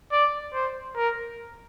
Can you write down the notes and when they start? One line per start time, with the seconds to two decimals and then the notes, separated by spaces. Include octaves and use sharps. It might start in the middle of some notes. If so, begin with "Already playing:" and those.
0.12 D5
0.54 C5
0.96 A#4